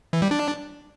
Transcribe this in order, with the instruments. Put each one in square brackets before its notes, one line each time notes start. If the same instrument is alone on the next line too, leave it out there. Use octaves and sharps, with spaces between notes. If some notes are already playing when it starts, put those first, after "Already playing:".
[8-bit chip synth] E3
G3
D4